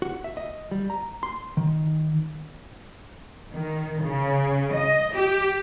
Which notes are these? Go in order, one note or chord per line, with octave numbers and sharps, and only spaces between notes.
F#4
E5
D#5
G3
A#5
C6
D#3
D#3
C#3
D#5
G4